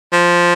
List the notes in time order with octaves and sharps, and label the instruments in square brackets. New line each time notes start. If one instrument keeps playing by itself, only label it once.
[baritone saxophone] F3